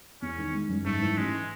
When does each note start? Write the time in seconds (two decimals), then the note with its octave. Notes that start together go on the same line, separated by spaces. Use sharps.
0.22 E2 C#4
0.38 D#3
0.54 G#3
0.69 F#1
0.85 G#2 A3
1.01 E3
1.16 A1 G#3